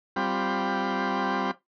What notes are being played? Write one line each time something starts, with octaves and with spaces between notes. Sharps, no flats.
G3 C4 F4 G5 B5